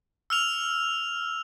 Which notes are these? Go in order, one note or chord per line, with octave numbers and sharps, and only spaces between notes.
E6 F6 F7